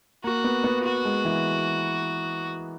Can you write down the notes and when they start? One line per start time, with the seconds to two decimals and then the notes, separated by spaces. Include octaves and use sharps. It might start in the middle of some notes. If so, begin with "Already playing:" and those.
0.24 A#3 F#4
0.44 B3
0.64 B3
0.84 F#4
1.05 G#3
1.25 E3